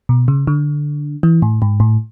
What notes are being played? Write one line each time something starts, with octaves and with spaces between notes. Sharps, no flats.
B2
C#3
D3
E3
A2
G#2
A2